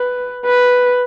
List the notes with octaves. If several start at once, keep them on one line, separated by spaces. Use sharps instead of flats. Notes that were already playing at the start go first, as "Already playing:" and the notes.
Already playing: B4
B4